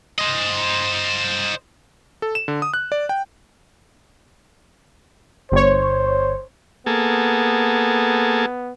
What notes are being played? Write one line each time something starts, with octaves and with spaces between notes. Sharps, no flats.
C5 D#5
A4
E7
D3
D#6
F#6
D5
G5
G1 C5 C#5
A#3 B3 G#4 A4